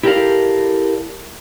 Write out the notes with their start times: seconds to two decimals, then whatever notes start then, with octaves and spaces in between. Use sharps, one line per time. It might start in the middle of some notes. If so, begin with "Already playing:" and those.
0.03 E4 G4 A4 A#4 D5 F5